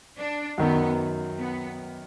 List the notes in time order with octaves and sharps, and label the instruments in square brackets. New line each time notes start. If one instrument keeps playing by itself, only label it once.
[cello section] D4
[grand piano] F#2 D#3 F#3 [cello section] B3
[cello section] B3